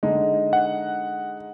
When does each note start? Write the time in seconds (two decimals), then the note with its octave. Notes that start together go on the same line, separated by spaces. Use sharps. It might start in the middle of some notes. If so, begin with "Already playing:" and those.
0.03 D3 G#3 D#4
0.53 F#5